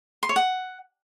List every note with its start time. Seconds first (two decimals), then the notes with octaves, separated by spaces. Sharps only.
0.23 C6
0.29 C#5
0.36 F#5